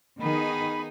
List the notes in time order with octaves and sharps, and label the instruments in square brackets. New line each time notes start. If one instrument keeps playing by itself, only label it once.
[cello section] D#3 [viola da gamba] B3 D#4 G#4 [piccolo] B5